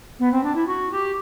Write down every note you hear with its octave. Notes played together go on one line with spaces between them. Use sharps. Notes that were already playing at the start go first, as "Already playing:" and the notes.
B3
C4
D4
E4
F#4
G4